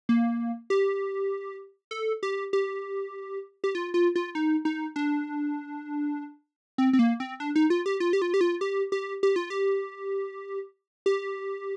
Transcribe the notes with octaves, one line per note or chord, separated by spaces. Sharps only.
A#3
G4
A4
G4
G4
G4
F4
F4
F4
D#4
D#4
D4
C4
C4
A#3
C4
D4
D#4
F4
G4
F4
G4
F4
G4
F4
G4
G4
G4
F4
G4
G4